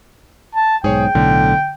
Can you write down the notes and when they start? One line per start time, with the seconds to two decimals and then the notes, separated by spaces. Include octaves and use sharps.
0.55 A5
0.84 B1 G#2 G#4 C#5 G5
1.15 B1 A2 D3